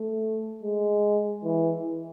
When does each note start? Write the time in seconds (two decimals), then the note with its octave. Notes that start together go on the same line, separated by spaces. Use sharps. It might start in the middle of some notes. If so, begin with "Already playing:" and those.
Already playing: A3
0.63 G#3
1.44 E3